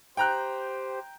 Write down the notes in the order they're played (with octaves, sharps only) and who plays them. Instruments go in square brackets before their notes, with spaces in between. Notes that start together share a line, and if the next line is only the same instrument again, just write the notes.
[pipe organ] G4 C5 [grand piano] G5 A#5 F#6